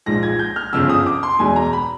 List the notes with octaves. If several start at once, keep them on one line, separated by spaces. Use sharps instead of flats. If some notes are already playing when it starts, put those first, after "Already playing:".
A#1 G#2 F3 G#3 A#6
G#6
G6
F6
G1 F2 C#3 E6
D#6
D6
C6
E2 B2 G#3 G#5
A#5
B5